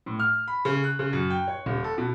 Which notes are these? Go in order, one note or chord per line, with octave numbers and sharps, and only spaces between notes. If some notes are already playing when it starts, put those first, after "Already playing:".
A2
F6
B5
C#3
F#6
C#3
F#2
G5
C#5
D#1
A4
B2